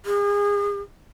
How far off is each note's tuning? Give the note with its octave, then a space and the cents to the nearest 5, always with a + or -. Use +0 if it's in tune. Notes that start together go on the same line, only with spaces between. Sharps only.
G#4 -35